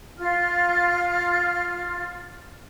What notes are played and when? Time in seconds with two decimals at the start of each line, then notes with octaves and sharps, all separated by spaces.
0.18 F4 F6